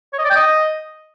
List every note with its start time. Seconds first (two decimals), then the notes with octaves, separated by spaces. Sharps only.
0.13 C#5
0.19 D#5
0.25 D5
0.30 G5
0.36 D#5